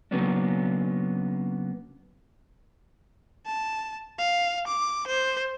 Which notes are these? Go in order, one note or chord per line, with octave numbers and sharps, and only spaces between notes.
C#3 F#3 A#3 B3 C#4 D4
A5
F5
D6
C5